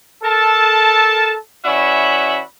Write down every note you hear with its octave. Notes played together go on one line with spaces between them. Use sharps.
A4 A#4 A5
E3 C#4 F#4 D5 E5 B5